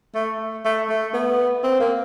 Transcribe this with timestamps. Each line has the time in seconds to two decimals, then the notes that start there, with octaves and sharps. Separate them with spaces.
0.15 A3
0.65 A3
0.89 A3
1.14 B3
1.64 C4
1.80 A#3